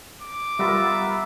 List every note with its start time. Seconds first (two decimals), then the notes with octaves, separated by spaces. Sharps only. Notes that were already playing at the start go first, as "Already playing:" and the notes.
0.21 D6
0.59 G3 B3 F4 A#4 E5